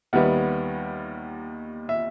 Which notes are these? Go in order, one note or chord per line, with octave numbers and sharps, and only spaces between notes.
D#2 D#3 G3 B3 E5 F#5
E5